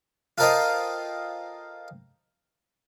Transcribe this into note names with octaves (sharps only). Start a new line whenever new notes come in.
F4 A4 A#4 C5 D#5 G5